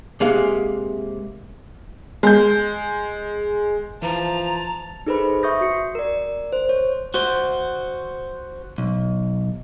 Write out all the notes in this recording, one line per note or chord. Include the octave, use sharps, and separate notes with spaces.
C3 G#3 A#3 G#4 F5 F#5
G#3 G6
E3 F3 A5 A#5
D#4 G#4 A4 B4 C5 B5
E5 C#6 D#6 G6 A#6
F#4 C#7
A#4 D5
C5
C#5
F#4 C5
B1